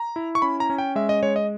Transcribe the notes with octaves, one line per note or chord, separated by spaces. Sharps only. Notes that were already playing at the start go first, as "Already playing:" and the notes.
Already playing: A#5
E4
C#6
C#4 B5
A#5
C#4
G5
G#3 E5
D#5
G#3 C#5
D#5